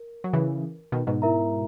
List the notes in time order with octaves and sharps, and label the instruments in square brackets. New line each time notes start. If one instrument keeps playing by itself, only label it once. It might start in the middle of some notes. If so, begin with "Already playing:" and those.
Already playing: [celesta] A#4
[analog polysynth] F#3
C#3 E3
B2 D#3
G#2 B2
[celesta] E4 A#4 E5 A#5